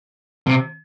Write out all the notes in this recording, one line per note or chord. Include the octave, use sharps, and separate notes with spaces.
C3